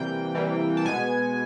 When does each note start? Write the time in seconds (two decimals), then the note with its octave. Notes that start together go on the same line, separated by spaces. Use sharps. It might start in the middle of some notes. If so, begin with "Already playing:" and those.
Already playing: C3 E3 G3 A#3 G5
0.34 C3 E3 G3 A#3
0.77 A5
0.85 B2 G#3 B3 G#5